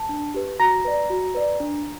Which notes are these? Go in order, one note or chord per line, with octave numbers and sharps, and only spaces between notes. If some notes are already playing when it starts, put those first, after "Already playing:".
Already playing: A5
D4
G4 B4
F#4 A#5 A#6
B4 D5
F#4
B4 D5
D4